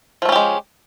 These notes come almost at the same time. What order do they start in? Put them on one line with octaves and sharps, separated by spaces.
F3 A3 C#4 G4 G#3